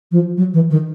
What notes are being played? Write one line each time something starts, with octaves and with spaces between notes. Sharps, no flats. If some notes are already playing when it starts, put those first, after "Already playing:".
F3
F#3
E3
D#3